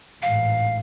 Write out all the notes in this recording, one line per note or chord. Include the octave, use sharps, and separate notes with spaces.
A1 G#2 F5